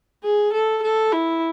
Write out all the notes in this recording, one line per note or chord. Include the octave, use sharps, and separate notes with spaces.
G#4
A4
A4
E4